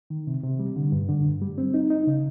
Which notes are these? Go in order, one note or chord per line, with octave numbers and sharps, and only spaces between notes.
D#3
C3
C3
G3
D3
G2
D3
G2
G3
C4
D#4
D#4
C#3